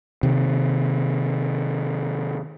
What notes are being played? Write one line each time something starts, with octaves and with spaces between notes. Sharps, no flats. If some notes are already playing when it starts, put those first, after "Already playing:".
C3 D#3